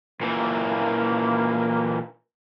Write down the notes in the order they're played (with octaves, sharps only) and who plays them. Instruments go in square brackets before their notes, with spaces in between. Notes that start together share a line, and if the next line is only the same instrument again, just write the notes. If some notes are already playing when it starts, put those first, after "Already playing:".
[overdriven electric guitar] A#2 E3 [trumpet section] A#3